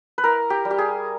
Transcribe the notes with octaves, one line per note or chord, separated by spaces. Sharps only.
B4
E4 A#4
G4
G3
G4
G#4